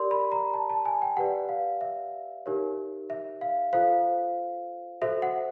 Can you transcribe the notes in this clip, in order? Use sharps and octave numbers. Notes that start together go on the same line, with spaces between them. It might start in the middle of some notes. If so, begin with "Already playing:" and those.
Already playing: G4 A#4 D5 C6
B5
A#5
A5
A5
G#5
G5
G4 B4 D5 F#5
F5
E5
D#4 G4 A#4 C#5
E5
F5
F4 A4 C5 F5
F#4 A4 C5 E5
F#5